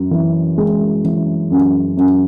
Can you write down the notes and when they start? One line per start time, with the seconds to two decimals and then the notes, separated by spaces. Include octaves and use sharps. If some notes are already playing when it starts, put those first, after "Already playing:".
Already playing: F#2
0.11 E3
0.58 G#3
1.04 E3
1.50 F#2
1.97 F#2